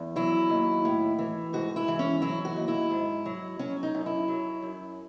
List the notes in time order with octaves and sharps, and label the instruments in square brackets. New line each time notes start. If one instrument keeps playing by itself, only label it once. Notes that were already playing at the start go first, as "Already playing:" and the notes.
Already playing: [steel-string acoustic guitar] E2
F#3 E4
D#2
A2
E3
G#2 F#4
E4
E3
C#4
F#3 E4
F#4
D#2
E4
G#2
F#3
F#3 C#4
D#4
F#2
E4
F#3
F#2